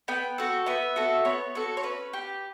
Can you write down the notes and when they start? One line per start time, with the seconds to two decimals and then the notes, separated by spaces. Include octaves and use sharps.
0.08 B3 G5
0.38 F#4 A4
0.66 B3 E5
0.96 F#4 A4
1.25 B3 C#5
1.55 F#4 A4
1.77 C#5
1.83 C#4 B4
2.13 G4